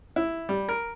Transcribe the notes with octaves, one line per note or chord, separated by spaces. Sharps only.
E4
G3
A#4